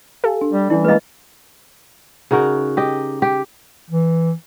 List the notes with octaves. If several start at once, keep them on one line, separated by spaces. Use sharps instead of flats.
G4 A4 F5 G#5
D4
G3
E3 G3 C#4 E4 D5
G#3 A#3 B4 D#5
C#3 D#4 F#4 A#4
G4 D#5
G4
E3